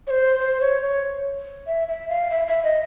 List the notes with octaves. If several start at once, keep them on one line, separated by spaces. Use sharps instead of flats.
C#5
C5
C5
C#5
C#5
E5
E5
F5
E5
E5
D#5